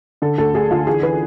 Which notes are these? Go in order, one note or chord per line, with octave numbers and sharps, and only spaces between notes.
D3 A4
D2 A4
D2 G#4
D3 F4
E3 G#4
E3 B4